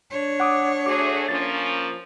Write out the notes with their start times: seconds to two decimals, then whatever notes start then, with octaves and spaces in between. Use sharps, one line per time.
0.11 D4 C#5
0.40 F#5 D6 D#6
0.86 A3 F#4 G#4 D6
1.29 F3 A#3 C#4 A6